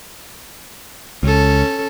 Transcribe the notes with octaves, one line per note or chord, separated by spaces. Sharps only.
C#2 C#4 A4